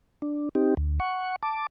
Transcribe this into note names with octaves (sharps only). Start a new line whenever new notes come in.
D4
C4 D#4 G4
D2
F#5 C#6
A5 D6